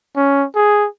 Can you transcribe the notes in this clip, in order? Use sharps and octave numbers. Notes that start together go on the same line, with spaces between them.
C#4
G#4